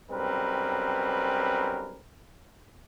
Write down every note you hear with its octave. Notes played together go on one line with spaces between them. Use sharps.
B1 G3 C4 C#4 A#4 B4